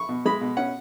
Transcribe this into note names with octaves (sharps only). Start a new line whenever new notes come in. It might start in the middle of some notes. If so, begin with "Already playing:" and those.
Already playing: C#6
B2
G#3 B5
B2
C#4 F#5